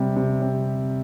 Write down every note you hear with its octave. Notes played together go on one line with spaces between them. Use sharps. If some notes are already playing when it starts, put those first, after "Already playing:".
Already playing: C3 G3
C3
C3